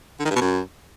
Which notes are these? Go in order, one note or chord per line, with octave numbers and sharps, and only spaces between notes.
D3
D#3
G2
B2
F#2